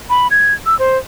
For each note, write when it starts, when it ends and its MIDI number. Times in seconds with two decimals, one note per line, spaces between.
0.10 0.28 83
0.31 0.54 92
0.66 0.77 88
0.79 0.98 72